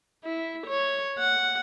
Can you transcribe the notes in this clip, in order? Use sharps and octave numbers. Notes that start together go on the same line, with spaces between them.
E4
C#5
F#5